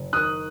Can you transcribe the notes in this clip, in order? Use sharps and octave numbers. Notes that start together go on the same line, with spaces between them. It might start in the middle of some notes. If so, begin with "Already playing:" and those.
Already playing: F#1
D#3 D#6 F#6